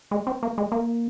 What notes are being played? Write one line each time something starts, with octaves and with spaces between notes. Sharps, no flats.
G#3
C4
A#3
G#3
A#3